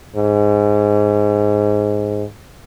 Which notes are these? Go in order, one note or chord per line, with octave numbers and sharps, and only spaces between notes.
G#2